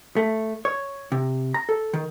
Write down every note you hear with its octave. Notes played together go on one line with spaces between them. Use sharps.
A3
C#5
C3
A#5
A4
D#3